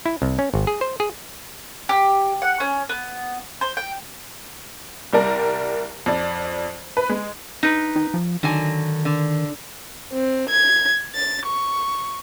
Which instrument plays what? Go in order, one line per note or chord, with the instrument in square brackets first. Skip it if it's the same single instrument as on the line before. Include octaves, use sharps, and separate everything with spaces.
[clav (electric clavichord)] E4
C2
C#4
G#1
G#4
C5
G#4
[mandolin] G4
F#5
C#4
B3
C5
G5
[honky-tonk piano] C2 G3 A#4 D5 A#5
F2 D5
B4
G#3
[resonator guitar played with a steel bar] D#4 B4
[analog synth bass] D#3
F3
[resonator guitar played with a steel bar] D3 F#3 G#5 [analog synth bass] D#3
[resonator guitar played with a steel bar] D3
[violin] C4
G#6
A6
C#6